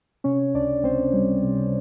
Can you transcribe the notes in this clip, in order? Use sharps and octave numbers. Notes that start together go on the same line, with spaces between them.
C3 C#4 C#5
C#2 D4 D5
C#2 C4 C5
G3
C3